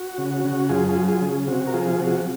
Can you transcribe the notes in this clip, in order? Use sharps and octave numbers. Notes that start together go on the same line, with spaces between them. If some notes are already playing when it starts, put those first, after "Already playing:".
Already playing: F#4
C#3
F#4
C#3
F#2 F4 G#4
F4 G#4
F#3
F4 G#4
C#3
C3 F#4
A#4
F3 F4 G#4
C3 F#4